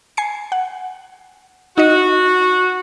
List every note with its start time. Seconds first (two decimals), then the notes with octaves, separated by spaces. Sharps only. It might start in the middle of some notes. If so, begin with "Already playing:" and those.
0.17 G#5 C7 C#7
0.52 F#5
1.78 D#4 F#4 D#5